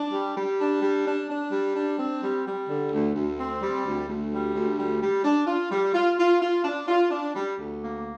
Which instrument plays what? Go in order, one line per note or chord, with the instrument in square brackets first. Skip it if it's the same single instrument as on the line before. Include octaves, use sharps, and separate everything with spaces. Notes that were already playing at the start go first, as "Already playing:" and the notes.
Already playing: [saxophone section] D4
G3
G3
D4
G3
D4
D4
G3
D4
C4
G3
G3
D3
D2
D2
C4
G3
D2
D2
G3
D2
G3
G3
D4
F4
G3
F4
F4
F4
D4
F4
D4
G3
D2
A#3